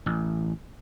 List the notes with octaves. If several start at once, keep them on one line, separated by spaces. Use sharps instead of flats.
A1